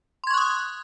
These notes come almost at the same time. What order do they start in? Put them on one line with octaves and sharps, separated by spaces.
C6 G#6 C#6 F#6 D#6